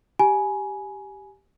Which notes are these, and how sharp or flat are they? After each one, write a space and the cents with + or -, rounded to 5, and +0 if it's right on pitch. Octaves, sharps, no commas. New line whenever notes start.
G4 +0 G#5 +15 B5 -40